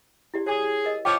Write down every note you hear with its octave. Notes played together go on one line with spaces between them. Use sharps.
E4 G4 D5
G#4 C#5 D#6
A#4 D#5
F3 C#5 F5 G5 D6